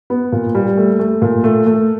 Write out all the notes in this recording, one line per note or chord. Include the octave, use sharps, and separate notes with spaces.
B3
A#2
G3
A3
A3
A#2
A3
A3